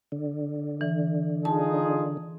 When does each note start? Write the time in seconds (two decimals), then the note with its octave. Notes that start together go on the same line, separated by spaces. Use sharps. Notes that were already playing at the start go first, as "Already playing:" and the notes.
0.12 D3
0.81 E3
1.45 D#4 F4 G#4 A5